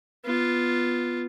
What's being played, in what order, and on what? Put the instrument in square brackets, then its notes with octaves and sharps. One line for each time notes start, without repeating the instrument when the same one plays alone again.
[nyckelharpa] B3 F4